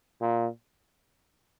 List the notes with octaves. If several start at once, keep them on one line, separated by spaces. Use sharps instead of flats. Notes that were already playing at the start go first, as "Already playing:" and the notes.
A#2